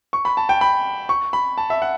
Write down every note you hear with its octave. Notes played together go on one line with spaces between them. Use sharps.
C#6
B5
A5
G5
B5
C#6
B5
A5
E5
F#5